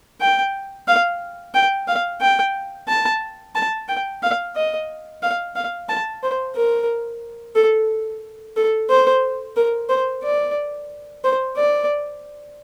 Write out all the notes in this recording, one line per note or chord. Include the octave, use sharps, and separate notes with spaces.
G5
F5
G5
F5
G5
A5
A5
G5
F5
D#5
F5
F5
A5
C5
A#4
A4
A4
C5
A#4
C5
D5
C5
D5